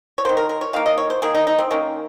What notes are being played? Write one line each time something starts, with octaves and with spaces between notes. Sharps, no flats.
C#5
D#3 A#3 C5
A#4
A#4
C#5
D#3 A#3 F5
D#5
C#5
C5
D#3 A#3 G#4
D#4
D#4
C4
D#3 A#3 C#4